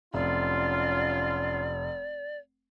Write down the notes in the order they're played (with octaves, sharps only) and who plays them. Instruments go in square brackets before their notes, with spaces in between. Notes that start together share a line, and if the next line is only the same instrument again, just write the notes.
[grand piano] F1 [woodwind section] F#3 C#4 F4 [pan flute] D5